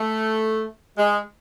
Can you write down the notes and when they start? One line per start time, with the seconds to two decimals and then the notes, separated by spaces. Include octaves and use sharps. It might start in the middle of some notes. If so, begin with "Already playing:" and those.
Already playing: A3
0.98 G#3